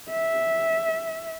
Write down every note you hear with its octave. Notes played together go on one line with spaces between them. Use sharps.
E5